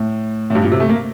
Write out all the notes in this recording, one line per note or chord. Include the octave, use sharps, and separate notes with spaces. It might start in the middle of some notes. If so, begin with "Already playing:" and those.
Already playing: A2
A2
G2
A#2
C3
A3
A#3